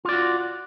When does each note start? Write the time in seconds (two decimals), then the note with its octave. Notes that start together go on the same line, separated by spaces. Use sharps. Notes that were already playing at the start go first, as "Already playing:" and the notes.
0.05 F4
0.09 D5
0.13 F#4